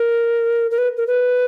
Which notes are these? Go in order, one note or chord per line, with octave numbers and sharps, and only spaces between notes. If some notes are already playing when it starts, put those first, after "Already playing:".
Already playing: A#4
A#4
B4
A#4
B4